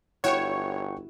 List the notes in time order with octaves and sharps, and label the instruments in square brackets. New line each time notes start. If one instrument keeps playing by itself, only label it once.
[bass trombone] G1 [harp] E4 F#4 E7 [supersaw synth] C#5 [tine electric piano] F#5 G5 C#6